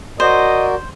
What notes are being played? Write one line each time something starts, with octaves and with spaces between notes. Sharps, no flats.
F#4 A#4 C5 D5 D#5